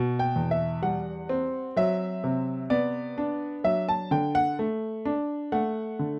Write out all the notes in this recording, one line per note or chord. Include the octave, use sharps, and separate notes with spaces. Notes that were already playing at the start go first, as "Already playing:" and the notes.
Already playing: B2
G5
E2
E5
G3 F#5
C4
F#3 E5
C3
B3 D5
D4
F#3 E5
A5
D3 G5
F#5
A3
D4
A3 F#5
D3